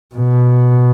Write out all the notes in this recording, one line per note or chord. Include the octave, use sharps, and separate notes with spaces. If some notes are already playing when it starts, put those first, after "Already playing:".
B2